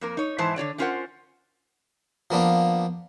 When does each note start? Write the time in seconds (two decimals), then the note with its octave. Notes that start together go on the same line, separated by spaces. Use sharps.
0.01 F2 A#3 A#4
0.17 D#4 C#5
0.38 G#2 E3 E4 C5 A5
0.56 D3 F#4 C#5 D5
0.78 A3 C#4 F4 A#4 C5 F#5
2.31 F3 A#3 B3 D4